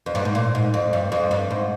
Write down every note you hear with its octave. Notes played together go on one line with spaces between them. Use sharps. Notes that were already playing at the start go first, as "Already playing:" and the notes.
F2
G2
G#2
A#2
G#2
F2
G2
F2
G2
G#2